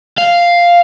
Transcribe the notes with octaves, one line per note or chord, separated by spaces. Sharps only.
F5